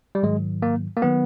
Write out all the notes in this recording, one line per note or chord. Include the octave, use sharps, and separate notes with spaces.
G3
G#2 D#3 F#3 G#3
A#3
A#3
D#3 F#3 B3